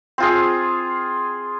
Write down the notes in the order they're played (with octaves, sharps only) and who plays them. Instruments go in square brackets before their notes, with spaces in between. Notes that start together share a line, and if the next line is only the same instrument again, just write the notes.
[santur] C4 F4 G#4